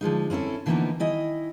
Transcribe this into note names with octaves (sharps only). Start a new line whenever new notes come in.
D3 F3 G#3 D#4
C4 C#4 E4 G4 A4
D3 E3 F3 A#3 B3 D#4
D#3 E4 D#5 G#5